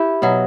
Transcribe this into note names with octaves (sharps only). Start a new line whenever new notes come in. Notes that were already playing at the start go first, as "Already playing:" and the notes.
Already playing: E4 G4
B2 F#3